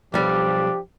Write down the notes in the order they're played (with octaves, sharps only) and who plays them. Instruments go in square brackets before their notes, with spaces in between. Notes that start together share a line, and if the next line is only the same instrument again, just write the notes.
[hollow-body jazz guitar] B1 G3 [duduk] F3 [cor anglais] D4 [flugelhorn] G4